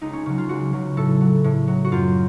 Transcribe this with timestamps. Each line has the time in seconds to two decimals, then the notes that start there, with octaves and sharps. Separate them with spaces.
0.01 C#2 D#4
0.13 C#4
0.26 C#3 F#3 C#4
0.38 F4
0.49 C#2 F#4
0.73 C#3 F#3
0.97 A2 A4
1.21 F#3
1.44 A2
1.68 F#3
1.84 F#4
1.92 F#2 F4